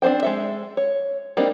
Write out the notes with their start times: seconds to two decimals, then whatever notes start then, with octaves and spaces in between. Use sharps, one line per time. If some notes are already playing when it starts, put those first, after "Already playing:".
0.02 C4 D4 F#4 C5 G5
0.23 G#3 A4 E5
0.77 C#5
1.37 G3 A#3 C4 D4 D#4